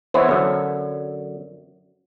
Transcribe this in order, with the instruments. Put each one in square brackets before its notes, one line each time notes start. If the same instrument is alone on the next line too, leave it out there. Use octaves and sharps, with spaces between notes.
[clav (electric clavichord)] E3 B3 [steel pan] C5 C#5 E5
[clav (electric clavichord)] F#2 D3